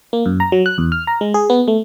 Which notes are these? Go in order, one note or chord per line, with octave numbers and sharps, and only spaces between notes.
A#3
F#2
A#5
F#3
F#6
E2
F6
A#5
G#3
G#4
B3
A3